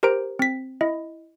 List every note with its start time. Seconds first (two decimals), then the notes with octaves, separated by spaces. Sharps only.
0.03 G4 A#4 C5 A#5 D7
0.39 C4 B6
0.81 E4 D#5